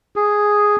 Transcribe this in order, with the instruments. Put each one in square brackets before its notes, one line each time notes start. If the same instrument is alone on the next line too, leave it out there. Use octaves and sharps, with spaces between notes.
[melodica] G#4